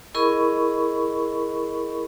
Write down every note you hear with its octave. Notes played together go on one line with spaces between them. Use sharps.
E4 G#4 A#4 D#5 B5 C#6